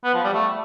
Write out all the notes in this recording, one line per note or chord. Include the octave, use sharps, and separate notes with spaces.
B3
F3
G3
A3